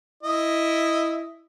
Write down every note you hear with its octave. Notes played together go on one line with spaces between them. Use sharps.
E4 D#5